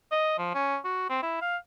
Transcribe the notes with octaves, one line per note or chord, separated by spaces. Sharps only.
D#5
F3
C#4
F#4
C4
E4
F5